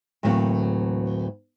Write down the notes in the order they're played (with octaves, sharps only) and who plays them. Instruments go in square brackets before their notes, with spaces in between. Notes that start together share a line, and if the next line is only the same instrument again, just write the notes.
[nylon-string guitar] D2 A2 E3 F#3 A#3 C4